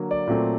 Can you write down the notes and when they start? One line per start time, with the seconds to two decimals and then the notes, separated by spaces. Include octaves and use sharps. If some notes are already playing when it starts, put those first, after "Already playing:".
Already playing: D3 F#3 A#3
0.11 D5
0.27 A#2 F#3 A3 C4